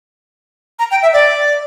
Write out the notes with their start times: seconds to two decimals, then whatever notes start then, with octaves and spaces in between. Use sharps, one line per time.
0.79 A#5
0.91 G5
1.03 E5
1.13 D5